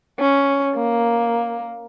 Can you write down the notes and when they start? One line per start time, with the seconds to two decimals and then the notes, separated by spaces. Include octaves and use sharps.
0.20 C#4
0.75 A#3